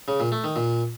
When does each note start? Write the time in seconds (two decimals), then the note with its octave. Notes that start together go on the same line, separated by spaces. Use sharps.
0.08 C#3
0.20 A#2
0.32 A3
0.44 D#3
0.56 A#2